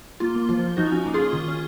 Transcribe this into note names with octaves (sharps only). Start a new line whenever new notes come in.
A#3 F4
A#3
F3 F4
F3
F3 D#4 F#4
C#4
A#3
F4 G#4
C#4
D#3
C#4